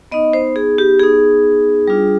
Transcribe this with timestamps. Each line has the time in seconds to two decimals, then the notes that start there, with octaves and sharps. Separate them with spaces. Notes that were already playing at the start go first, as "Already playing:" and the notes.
0.11 B3 D#4 D#5
0.33 C5
0.56 G#4
0.78 G4
0.99 B3 D#4 G#4
1.87 G3 D4 F4